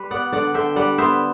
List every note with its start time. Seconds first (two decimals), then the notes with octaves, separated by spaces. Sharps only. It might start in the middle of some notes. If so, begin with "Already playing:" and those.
Already playing: G3 B4
0.11 B3 D5 F#5
0.32 D3 D5 F#5
0.54 D3 E5 G5
0.76 G3 D5 F#5
0.98 B3 C5 E5